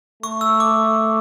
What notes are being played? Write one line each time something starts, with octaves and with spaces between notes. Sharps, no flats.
A3 C#6
E6
D6